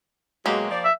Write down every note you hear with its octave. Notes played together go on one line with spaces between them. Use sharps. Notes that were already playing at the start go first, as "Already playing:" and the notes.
B2 F#3 G#3 A#3 G4
F3 D5
E5